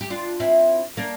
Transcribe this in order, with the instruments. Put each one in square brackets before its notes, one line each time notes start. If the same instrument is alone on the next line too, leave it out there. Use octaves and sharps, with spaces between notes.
[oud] G4
D4 F4
C4 E4
A#3 D4